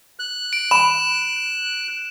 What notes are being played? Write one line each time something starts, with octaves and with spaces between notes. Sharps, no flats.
F#6
D7
B5 E7